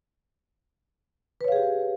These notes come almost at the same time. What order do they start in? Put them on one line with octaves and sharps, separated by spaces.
B4 C#5 F5 G#4 G4